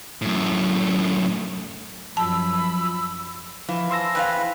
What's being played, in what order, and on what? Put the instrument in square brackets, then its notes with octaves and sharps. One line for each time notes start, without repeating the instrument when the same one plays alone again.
[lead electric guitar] F#2 A2
[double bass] F#2 [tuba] F3 [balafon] A5 [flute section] B5 E6
[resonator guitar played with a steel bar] E3 [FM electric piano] F3 [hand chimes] F5
[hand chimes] C5 G#5 A5 [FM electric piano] C6 E6 A#6
[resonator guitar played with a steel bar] E2 D4 F5 [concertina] B4 [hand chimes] G5
[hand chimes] E4